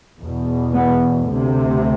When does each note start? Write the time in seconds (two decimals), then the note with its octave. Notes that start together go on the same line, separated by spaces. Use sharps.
0.20 E2 B2
0.74 B3
1.30 D2 C3